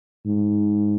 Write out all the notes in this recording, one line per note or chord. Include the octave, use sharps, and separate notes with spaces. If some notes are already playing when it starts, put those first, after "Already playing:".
G#2